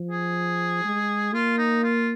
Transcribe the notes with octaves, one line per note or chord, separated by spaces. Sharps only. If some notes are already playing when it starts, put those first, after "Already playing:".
Already playing: F3
G#4
G#3
A#3 F4
D#4
F4